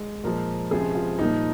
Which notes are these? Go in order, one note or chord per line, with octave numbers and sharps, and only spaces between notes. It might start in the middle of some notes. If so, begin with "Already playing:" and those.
Already playing: G#3
A#2 F3 G#3 A#4
C#2 C3 F3 G#4
F4
C2 A#2 F3 A#3 D#4